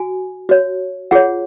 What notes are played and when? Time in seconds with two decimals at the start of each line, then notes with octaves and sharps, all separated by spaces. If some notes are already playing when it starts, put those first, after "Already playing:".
Already playing: F#4 G#5
0.49 F#4 C#5
1.11 F4 G#4 C#5 F#5